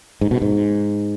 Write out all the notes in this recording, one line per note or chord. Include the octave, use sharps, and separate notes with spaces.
G#2
B2
G#2